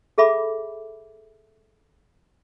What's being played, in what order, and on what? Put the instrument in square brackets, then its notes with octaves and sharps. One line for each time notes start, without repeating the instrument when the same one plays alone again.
[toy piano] G#4 A4 E5 B5 D6